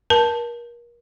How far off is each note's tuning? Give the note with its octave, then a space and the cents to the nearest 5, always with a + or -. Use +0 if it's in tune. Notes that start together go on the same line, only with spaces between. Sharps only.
A#4 +30 A5 +0